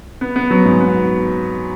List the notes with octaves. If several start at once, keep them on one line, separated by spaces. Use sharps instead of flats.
B3
B3
F#3
G#2
B3